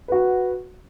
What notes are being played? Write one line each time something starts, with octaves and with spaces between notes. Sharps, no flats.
F#4 B4 F#5